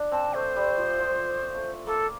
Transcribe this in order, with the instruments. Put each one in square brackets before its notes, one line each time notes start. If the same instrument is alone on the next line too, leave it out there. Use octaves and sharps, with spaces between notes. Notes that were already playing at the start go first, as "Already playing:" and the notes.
Already playing: [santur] D4
[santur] C4 [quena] A5
[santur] A3 [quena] C5
[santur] G3
F3
F3
A3
[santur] A#3 [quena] A4